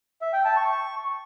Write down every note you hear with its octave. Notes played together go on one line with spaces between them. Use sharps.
E5
G5
A5
C#6